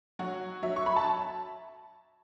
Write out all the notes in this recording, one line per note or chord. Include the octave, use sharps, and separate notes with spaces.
F#3 F#4
F#3 E5
C#6
B5
A5